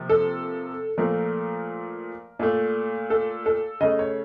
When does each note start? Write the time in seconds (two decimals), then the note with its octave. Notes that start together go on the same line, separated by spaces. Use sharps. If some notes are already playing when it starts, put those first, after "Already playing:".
Already playing: C3 F3 A#3
0.09 A4
0.98 A#2 F3 A3 A#4
2.39 A#2 A3
3.10 A4
3.46 A4
3.81 C#3 A3 D#5
3.99 C#5